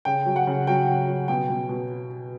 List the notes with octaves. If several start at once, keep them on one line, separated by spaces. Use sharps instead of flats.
C#3 G5
F#3
F#5
C#3
F#3 G5
C#3
F#3
B2 G5
B2
B2